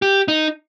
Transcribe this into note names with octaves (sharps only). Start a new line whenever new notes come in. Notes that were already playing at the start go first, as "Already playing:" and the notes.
G4
D#4